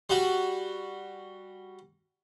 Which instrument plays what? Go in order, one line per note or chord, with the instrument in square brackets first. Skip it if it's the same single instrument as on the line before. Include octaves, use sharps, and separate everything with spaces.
[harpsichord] G3 F#4